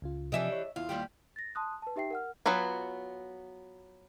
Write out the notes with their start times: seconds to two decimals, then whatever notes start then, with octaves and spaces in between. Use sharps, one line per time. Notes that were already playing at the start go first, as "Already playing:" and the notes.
0.02 C#2 C#3 F4
0.32 C3 E3 F3 D4 G4 D#5 E5 G#5
0.52 C#5
0.76 E2 E4 F4
0.89 D#2 G3 G4
1.36 A6 A#6
1.55 A5 C6 D#6 F#6
1.82 B4 A5
1.96 D#4 G4 E5 G5 C7
2.11 A#4 F#5 F6
2.46 F#3 B3 F4 B4 G#5